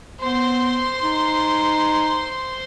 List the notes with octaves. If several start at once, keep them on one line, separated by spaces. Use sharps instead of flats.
B3 C5 C6
D#4